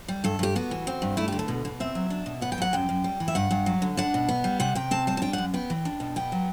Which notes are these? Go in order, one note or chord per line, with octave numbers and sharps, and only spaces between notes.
G3
G2 A4
G2 G4
B3 F#4
E3
C4
G2
A3 E4
D3 G4
A4
B2
B2
C4 E5
F#3
D4
B2
B3 F#5
G5
F#3 F#5
F#2 G5
F#2
G3
E3
E5
G2 F#5
G2
F#3
D3
D4 F#5
B2
B3
G3
C3 F#5
C3 G5
C4 A5
G3 A5
A5
D4 G5
F#2 F#5
B3 G5
E3
D4
B2
B3 G5
F#3